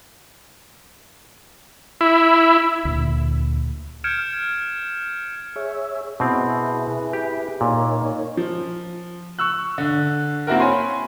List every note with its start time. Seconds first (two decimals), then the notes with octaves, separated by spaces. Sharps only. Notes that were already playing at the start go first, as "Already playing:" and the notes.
2.01 E4
2.85 D2 A#2
4.04 F6 G6 G#6 C#7 D7 E7
5.56 G#4 C#5 E5
6.20 B2 C4 E4 G#4 B4
7.13 G4
7.61 A#2 D#4 A#4 C#5
8.37 F3
9.39 C#6 E6 F#6
9.78 D3
10.47 A#3 C4 E4 F#4 A#4
10.60 C#5 G#5 B5 C6